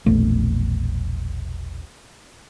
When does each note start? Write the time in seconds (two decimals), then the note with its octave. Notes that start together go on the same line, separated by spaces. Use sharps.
0.06 E1 A#1 A3